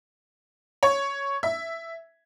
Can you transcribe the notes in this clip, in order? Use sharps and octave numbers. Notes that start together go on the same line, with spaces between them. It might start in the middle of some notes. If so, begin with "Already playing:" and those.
C#5
E5